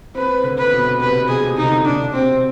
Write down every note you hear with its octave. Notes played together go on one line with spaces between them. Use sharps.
C4 B4
D3
B4
B2
C3 B4
B2
G#4
C3
D#4
D3
B2 D4
C3 C4